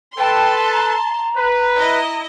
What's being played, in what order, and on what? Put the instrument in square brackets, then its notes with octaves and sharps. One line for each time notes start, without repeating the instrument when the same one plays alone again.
[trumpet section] A4 B4 [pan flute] G5 [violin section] A5 C6
[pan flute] A#5
[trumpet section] B4
[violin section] E4 D#5